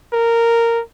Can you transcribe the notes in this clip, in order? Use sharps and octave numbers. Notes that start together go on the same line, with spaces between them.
A#4